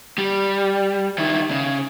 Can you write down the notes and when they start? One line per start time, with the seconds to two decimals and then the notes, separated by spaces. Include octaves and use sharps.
0.18 G3
1.18 D#3 E4
1.51 C#3